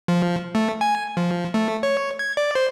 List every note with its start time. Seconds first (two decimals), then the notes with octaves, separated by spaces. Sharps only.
0.08 F3
0.55 A3
0.81 G#5
1.17 F3
1.54 A3
1.83 C#5
2.19 G#6
2.37 D5
2.55 C5